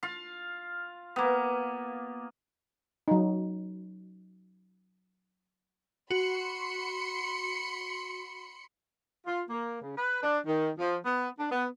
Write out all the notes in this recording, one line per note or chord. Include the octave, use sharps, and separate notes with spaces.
F4 F5
A#3 B3
F#3 D#4
F#4 B5 C6 C#7
F4
A#3
C#3
B4
D4
D#3
F3
B3
D4
B3